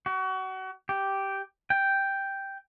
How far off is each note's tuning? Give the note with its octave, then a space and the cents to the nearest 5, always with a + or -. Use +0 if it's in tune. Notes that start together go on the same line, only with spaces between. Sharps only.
F#4 +30
G4 -5
G5 +0